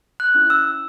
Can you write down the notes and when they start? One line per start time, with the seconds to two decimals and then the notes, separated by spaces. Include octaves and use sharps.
0.20 F#6
0.35 C#4 E4
0.50 E6